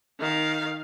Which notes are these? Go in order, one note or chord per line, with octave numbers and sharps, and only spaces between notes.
D#3 F5